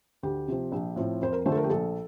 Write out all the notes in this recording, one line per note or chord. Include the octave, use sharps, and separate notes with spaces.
D2 G4
C3 F3 C4
A#1
A2 F3 C4
F2 C5
A#4
D3 F3 A3 D4 C5
A4
A#4
G4
A#1 A4